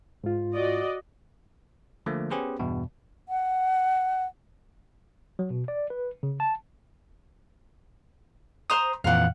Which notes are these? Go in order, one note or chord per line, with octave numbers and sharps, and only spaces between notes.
G#2 F4
F#4 D5 D#5
D3 F3 A3 A#3
B3 C#4 G4 G#4 B4 C5
E2 G2 B2
F#5
F#3
B2
D5
B4
C#3
A5
C5 A#5 C6 D#6
F2 A#2 E3 F5 F#5